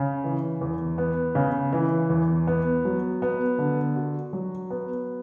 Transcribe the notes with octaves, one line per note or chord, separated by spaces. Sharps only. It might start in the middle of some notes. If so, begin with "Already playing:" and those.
Already playing: C#3
E3
E2
B3
C#3
E3
E2
B3
F#3
B3
D3
F#4
F#3
B3